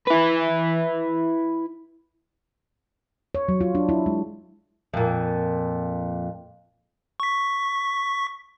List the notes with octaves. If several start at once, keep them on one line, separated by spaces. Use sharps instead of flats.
E4 B4
C#5
F#3
F4
D4
E4
G#3
F2 A#2
C#6 B6